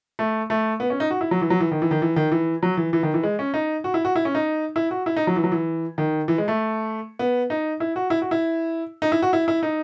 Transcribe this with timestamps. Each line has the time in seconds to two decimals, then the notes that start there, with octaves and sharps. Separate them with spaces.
0.19 A3
0.50 A3
0.80 B3
0.90 C#4
1.00 D#4
1.11 F#4
1.21 E4
1.31 F#3
1.41 E3
1.50 F#3
1.61 E3
1.71 D#3
1.82 E3
1.91 D#3
2.02 E3
2.16 D#3
2.32 E3
2.63 F#3
2.77 E3
2.93 E3
3.03 D#3
3.14 E3
3.23 G#3
3.39 C#4
3.54 D#4
3.84 F#4
3.94 E4
4.05 F#4
4.16 E4
4.25 C#4
4.35 D#4
4.76 E4
4.91 F#4
5.06 E4
5.16 D#4
5.27 F#3
5.36 E3
5.44 F#3
5.52 E3
5.98 D#3
6.28 E3
6.38 G#3
6.48 A3
7.19 B3
7.50 D#4
7.80 E4
7.96 F#4
8.10 E4
8.22 F#4
8.31 E4
9.02 D#4
9.12 E4
9.22 F#4
9.33 E4
9.48 E4
9.63 D#4